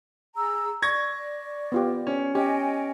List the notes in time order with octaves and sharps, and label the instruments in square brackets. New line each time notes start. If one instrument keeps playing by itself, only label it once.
[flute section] G#4 A#5 E6
[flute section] D5 [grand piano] C#6 G#6 A#6
[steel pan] B3 F4 G4
[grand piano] C#4
[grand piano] C#4 [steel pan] G4 [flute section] D#5 G5 G#5